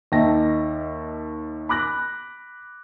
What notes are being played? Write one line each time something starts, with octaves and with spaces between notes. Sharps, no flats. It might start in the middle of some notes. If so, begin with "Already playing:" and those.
D#2 D#4 E5 G5 A5 A#6
B5 D6 F#6 A#6